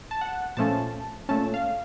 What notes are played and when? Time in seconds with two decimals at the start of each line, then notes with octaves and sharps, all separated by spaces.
0.11 A5
0.21 F#5
0.57 A#2 F3 A3 C#4 A5
1.29 A#2 A3 C#4 A5
1.54 F5